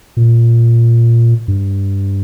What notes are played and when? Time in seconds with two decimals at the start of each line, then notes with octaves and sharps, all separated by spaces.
0.17 A#2
1.48 G2